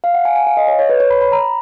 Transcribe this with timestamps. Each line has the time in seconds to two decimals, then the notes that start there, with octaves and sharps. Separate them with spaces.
0.04 F5
0.14 F#5
0.25 G#5
0.36 G#5
0.47 F5
0.57 D#5
0.68 C#5
0.79 C#5
0.89 B4
1.00 C#5
1.11 B5
1.21 B5
1.32 A#5